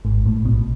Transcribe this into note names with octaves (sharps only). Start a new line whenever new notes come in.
G#1 G#2
A1 A2
B1 B2